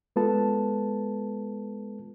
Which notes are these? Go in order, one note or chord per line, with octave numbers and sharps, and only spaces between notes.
G#3 B3 F4 A4 B4 A5